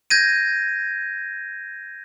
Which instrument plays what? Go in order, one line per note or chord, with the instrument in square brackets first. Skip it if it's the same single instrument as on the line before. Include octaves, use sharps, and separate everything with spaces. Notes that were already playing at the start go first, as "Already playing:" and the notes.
[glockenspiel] G6 G#6 A#6 D#7